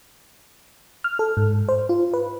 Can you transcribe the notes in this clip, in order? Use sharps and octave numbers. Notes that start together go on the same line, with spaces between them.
F6
A4
G#2
C5
F4
B4